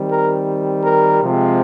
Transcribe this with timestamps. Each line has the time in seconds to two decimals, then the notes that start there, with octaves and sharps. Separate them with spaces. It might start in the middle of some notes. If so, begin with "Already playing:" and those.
Already playing: D#3 G3 C4
0.09 A#4
0.84 A#4
1.23 C3 F3 G#3 C4